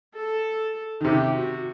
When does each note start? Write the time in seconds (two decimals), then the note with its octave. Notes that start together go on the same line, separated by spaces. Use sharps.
0.16 A4
1.01 D#3
1.05 C3 G4
1.35 F#4